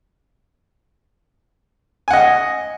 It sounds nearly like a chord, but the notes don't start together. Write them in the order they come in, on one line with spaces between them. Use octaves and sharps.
G#5 F#5 D#5